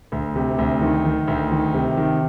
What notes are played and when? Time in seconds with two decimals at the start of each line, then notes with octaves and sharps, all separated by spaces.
0.12 D2
0.36 C3
0.59 D2
0.82 D#3
1.05 D#3
1.28 D2
1.52 D#3
1.74 C3
1.97 D#3